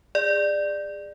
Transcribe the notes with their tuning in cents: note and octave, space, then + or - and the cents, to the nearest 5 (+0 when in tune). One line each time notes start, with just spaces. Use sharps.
G#4 -20 D5 +15